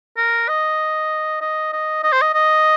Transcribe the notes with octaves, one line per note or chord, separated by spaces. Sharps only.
A#4
D#5
D#5
D#5
D#5
C5
D#5
D#5